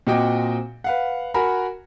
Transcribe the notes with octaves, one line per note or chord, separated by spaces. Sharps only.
A#2 C4 F#4 D#5 G5 D6
B4 F5 F#5
F#4 A#4 F#5 G#5 A#5 B5